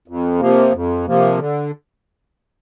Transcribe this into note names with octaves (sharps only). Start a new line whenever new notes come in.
F2
C3 F3 A#3
F2
C3 F3 A#3
D3